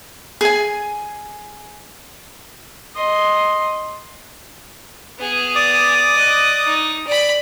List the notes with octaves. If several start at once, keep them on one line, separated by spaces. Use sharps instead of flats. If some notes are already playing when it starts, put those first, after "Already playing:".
G#4 G#5
D#5 C6
B3 G#4
D5 D6 D#6
D#5 F#6
D#4
D5 B5